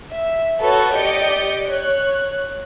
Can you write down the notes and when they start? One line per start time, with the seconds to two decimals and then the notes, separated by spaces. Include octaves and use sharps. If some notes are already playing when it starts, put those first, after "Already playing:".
0.11 E5
0.60 F#4 A4 B4 C#5
0.94 G4 D5 D#5 G6 C#7
1.66 C#5 F#6